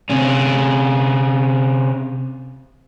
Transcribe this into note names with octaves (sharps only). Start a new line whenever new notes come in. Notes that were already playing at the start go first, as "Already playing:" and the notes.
C3 C#4